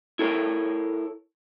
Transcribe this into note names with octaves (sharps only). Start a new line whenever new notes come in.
E4 A4 A#4 C#5